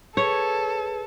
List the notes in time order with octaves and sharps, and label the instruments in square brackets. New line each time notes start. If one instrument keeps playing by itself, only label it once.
[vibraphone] G#4 B4 [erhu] A4 [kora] C#5